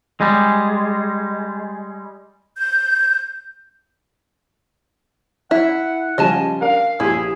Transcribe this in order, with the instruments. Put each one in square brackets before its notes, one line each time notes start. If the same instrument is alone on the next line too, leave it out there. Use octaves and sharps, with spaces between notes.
[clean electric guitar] G3 G#3
[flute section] G6
[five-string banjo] E4 [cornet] F#5
[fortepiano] C#3 F3 G3 [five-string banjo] D#5 G#5 A5
[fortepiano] D4 A#4 [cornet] F5
[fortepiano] A#1 G4 [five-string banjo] E4 [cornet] G#4